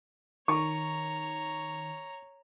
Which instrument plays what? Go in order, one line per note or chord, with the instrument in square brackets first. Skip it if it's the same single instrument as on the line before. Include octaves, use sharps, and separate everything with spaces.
[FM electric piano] D#3 [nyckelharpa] C#5 A#5 [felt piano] C#6